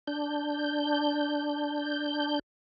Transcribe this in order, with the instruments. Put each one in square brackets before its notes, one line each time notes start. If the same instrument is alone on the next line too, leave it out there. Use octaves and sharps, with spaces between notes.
[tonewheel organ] D4 G6